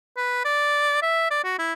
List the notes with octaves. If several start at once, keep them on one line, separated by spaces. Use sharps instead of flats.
B4
D5
E5
D5
F#4
E4